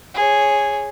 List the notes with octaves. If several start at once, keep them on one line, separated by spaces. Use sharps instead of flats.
G#4 C#5